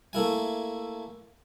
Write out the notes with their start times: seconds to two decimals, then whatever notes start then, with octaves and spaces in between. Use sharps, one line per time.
0.13 A3 A#3 E4 G#5